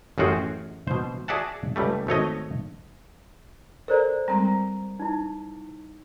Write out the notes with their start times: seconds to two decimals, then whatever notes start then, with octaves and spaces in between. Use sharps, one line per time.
0.18 A1 F#2 F4 F#4 G#4 G5
0.87 B2 C5
1.28 F#4 G#4 D5 E5 F#5 A5
1.76 C#2 G3 A3
2.07 G#1 A3 C#5 D#5
3.88 A4 A#4 C5 D5 A#5
4.28 G3 G#3 C4 A#5
5.00 D#4 E4